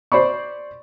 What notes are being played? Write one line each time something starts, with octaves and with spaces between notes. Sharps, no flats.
C5 D5 B5 C#6